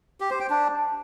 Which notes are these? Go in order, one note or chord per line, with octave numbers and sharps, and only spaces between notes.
G4
C5
G5
D4